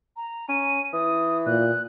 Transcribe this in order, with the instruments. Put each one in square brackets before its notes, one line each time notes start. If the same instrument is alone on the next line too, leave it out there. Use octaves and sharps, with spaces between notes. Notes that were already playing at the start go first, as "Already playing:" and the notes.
[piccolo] A#5
[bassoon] C#4 [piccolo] D#7
[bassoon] E3 [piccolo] D#6
[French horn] A#2 [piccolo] F#6